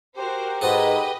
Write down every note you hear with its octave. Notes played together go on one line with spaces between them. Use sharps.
F#4 G4 A#4 C5
G#2 F#4 G#4 A4 B4 D#5